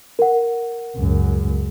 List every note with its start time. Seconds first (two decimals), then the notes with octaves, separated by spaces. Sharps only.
0.19 A#4 F#5
0.96 C#2 F#2